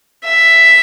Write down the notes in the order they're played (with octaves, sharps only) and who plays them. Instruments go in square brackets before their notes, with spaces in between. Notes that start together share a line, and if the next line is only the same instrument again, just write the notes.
[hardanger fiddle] E5